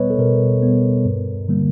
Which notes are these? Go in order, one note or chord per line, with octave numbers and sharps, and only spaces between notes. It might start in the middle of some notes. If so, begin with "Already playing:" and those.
Already playing: B2 G3 B3 B4 C#5 D#5
A4
B2 A#4
G3 B3
G2
D3 G3 A#3